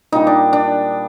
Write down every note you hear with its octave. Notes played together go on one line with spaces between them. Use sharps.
A#2 G3 D4 D#4
D4
D4